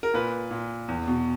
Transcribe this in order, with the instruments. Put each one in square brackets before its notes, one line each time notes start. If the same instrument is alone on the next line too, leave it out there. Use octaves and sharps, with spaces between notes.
[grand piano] A#4
A#2 B4
A#2
E2
B2